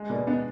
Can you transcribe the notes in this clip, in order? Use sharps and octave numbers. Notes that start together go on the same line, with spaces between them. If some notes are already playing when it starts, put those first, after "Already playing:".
Already playing: G#3
B2 A#3 D4
B3 D4 D#4